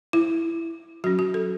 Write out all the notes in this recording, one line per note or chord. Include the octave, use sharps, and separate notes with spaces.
E4
F#3 C#4 F#4
F#4
A4